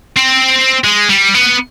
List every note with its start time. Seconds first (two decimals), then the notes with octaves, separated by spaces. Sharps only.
0.17 C4
0.84 G#3
1.09 G3
1.35 B3